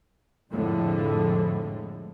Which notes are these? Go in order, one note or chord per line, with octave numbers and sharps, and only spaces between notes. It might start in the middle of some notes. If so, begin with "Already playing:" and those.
C2 F2 A2 D3 G#3